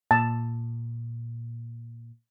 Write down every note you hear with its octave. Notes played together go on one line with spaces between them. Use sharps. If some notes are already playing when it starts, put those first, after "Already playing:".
A#2 A5